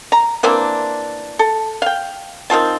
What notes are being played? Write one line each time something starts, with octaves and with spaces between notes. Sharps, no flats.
A#5
E3 A#3 C4 D4
A4
F5 G5
D#3 C4 F4 A5